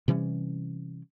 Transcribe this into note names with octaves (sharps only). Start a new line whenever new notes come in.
C3 E3 G3 C#4